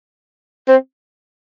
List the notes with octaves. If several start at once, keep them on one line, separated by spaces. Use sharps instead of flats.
C4